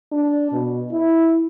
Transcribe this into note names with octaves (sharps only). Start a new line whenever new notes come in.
D4
B2
E4